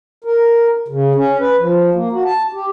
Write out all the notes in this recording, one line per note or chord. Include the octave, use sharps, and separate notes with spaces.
A#4
C#3
C#4
B4
F3
A#3
F#4
A5
G4